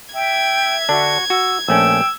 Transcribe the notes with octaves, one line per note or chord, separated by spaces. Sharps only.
E5 G5 G#6
D3 D4 F#4
F#4 E6
A#1 A3 C#4 G5 E6